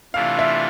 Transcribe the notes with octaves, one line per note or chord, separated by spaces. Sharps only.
C3 E3 A3 D4 F4 F5
E5